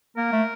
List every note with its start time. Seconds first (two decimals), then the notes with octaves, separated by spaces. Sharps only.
0.17 A#3 A#4
0.32 A3